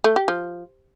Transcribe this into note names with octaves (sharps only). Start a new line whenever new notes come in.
A3
G4
F3